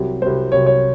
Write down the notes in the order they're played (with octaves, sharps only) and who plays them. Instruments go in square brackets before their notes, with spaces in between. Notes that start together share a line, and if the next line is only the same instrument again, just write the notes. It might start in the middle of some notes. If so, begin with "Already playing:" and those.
Already playing: [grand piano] C2 C3 F#3
C2 C3 F#3 C5
C2 C3 F#3 C#5
C#5